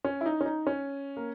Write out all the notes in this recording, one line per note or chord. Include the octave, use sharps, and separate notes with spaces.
C#4
E4
D#4
C#4
D#4
C#4
A#3